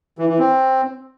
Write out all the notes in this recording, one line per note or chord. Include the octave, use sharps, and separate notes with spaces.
E3
E3
C4